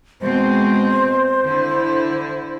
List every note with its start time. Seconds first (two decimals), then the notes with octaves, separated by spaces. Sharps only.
0.21 B2 G#3 C4 C5
1.44 D3 E4